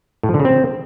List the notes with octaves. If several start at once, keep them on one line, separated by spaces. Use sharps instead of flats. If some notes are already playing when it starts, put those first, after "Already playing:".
A2
F3
D3
C#3
C4